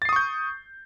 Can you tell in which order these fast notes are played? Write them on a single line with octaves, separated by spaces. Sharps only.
A6 C7 D#6 C#6 G6